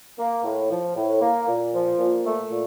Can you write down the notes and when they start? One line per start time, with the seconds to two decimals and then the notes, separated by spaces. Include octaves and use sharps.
0.19 A#3
0.44 A2
0.70 F3
0.96 A2
1.22 A#3
1.48 A#2
1.73 F3
1.99 A#2
2.25 A3
2.52 A#2